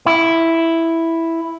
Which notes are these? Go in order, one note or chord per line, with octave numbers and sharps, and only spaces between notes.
E4